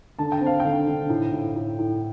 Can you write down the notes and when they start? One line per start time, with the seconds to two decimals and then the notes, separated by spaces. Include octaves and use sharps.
0.19 D3 A5
0.32 G5
0.41 C4
0.46 F5
0.60 D3 G5
0.87 D3
1.09 A2
1.33 A2
1.56 A2
1.79 A2